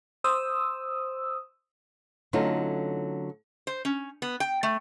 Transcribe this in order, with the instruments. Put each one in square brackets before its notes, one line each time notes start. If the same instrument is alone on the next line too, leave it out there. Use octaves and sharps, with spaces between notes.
[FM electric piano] C5 D#6 E6
[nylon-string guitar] D3 F#3 A3 C#4 D#4 F4
[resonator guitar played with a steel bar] C5
C#4
B3
G5
A3